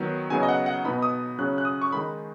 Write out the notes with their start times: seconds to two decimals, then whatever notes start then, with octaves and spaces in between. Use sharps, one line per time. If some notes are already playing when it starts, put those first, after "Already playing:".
Already playing: D#3 F#3 B3
0.30 C#3 F#3 B3 D#4 G#5
0.43 D#5
0.49 F#5
0.66 F#5
0.85 B2 B3 D#4 B5
1.02 D#6
1.38 C#3 F#3 C#4 F#6
1.58 F#6
1.65 D#6
1.82 C#6
1.92 D#3 G#3 D#4 B5